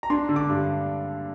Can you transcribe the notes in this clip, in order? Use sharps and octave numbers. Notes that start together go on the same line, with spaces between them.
A#5
D4 C6
D3
D6
G2